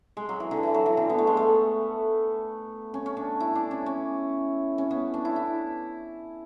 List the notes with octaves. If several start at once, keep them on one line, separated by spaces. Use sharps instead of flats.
G#3
F#3
E3
D3
E3
F#3
E3
D3
B3
A3
G#3
A3
C#4
C#4
D4
E4
D4
C#4
C#4
C#4
B3
D4
E4
E4